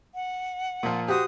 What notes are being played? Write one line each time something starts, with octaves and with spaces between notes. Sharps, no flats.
F#5
A#2 F3
F#4 G4 C5 D#6